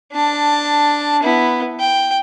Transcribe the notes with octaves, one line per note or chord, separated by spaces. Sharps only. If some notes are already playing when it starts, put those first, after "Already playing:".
D4 A5
B3 E4
G5